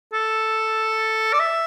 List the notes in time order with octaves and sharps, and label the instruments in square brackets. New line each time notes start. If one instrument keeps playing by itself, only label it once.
[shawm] A4
D5
E5